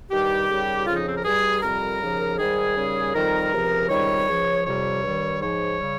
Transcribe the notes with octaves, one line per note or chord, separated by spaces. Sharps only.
G2 D#3 G3 G4
D#2 C#3 G3
F2 C#3 F3 F4
D#4
C4
A#4
G2 G3 G#4
F2 C3 G3 A#4
D#2 C#3 F3
G#2 D#3 G3 G#4
D#2 C#3 G3
F2 D#3 G3 A#4
C#2 C3 F3
C#2 C3 D#3 G3 C#5
C#2 C#3 F3
F2 C3 G3 C#5
G2 D#3 G3
G#2 F3 C#5
C#3 G3